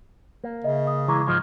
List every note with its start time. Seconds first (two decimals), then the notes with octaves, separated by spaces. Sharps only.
0.44 A#3
0.64 C#3 D#5 E5
0.87 D#6
1.08 E3 G#3 A#5 C#6 D6
1.27 G#2 F3 G#3 C6